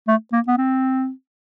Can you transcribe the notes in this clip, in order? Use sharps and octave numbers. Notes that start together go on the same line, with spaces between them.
A3
A#3
B3
C4